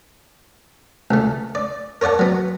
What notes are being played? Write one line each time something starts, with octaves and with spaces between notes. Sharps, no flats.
C#2 A3
D5
A#4 C#5 D5 F#5 A5
F#3 B3